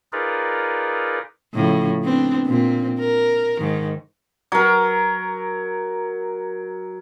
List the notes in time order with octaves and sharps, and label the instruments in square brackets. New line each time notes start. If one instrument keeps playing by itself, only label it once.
[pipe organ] D#4 F4 G#4 A#4 B4 D5
[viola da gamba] A2 C#3 F3
B3 C4 D4
A#2 C4
A#4
G#2 D#3
[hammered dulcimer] F#3 A#4